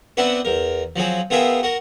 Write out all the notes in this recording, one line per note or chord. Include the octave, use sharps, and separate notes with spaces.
B3 C4 D4 E4 F#4 B4
E2 A#4
F3 F#3 C4 G#4
B3 F4 G#4 A#4 E5 G5
F#4 A#4